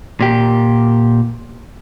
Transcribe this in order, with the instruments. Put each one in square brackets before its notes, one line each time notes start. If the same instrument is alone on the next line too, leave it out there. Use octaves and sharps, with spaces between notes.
[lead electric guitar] A#2 G4